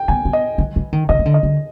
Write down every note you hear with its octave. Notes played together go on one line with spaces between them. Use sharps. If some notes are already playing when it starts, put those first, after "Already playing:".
Already playing: G5
B3 G#5
B3
D#5
E3
E3
D#3
D3 D#5
D#3
D3
D#5
D3